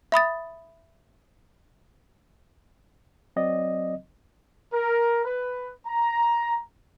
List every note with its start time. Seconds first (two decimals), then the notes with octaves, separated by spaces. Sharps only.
0.12 E5 B5 D#6 A6
3.36 F#3 C4 D5 D#5
4.73 A#4
5.25 B4
5.87 A#5